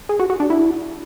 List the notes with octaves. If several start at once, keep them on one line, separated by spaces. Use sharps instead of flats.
G#4
F#4
F#4
D4
E4